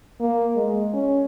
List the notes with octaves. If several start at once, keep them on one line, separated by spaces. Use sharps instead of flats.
A#3
G#3
C#4